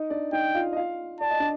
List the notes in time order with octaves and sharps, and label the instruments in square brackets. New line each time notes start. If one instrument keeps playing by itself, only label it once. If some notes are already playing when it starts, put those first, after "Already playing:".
Already playing: [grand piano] D#4 D#5
D4 D5
[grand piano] D#4 D#5 [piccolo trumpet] G5
[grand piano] F4 F5
D#5
F4 F5
[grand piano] D5 [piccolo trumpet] A5
[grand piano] D#5
D4 D5